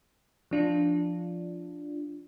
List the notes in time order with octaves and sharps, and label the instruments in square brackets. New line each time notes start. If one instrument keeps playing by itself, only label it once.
[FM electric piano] F3 D4 F4